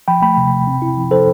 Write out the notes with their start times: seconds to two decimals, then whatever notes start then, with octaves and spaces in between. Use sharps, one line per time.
0.08 F3 G5 B5
0.22 A3 G5 B5
0.37 C3
0.52 C3
0.67 C4
0.82 E4
0.97 F3
1.11 F3 A4 C5